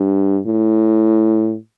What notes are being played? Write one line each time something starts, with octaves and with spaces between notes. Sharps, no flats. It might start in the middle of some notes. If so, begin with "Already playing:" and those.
Already playing: G2
A2